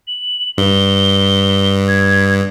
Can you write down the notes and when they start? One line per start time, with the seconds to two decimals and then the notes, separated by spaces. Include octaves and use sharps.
0.07 F#7
0.58 G2 G7
1.88 G#6